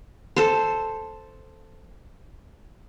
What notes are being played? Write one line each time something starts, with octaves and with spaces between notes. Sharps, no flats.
A4 C5